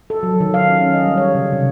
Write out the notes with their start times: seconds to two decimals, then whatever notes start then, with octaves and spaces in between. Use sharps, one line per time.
0.10 A4
0.23 F#3
0.40 D#3
0.54 F5
0.68 C#4
0.81 C#4
0.94 D#5
1.06 G3
1.17 C#5
1.35 C#3
1.53 C3